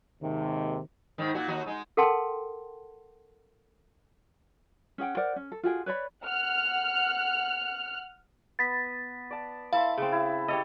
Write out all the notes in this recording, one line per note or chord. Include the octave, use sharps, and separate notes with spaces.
D#2 G#2 C3 D#3
G#2 D#3
A#2 F#4
D#2 D#4 F#4
G#3 D#4
A4 A#4 F#5 G5 A5 C6
C#4 G#4 F#5 G5
A#4 C5 D5 F#5
C#4
A4
F4 F#4 G#4 G5
B4 C#5 D5 B5
F#5 F6 F#6
B3 A6 B6
D5 A5
E4 A4 E5 F5 C6
C#3 C4
E4
G4 A4 C#5 D#5